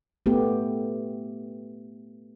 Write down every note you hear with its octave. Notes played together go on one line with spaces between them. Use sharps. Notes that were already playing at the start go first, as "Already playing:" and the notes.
A3 B3 G4